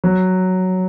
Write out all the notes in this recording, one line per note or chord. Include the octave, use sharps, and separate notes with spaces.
F#3